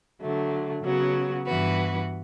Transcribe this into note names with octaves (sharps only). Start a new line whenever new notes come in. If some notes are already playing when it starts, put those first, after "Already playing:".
D3 F#3 A3
C#3 F#3 B3 F#4
G2 E3 B3 F#4 B4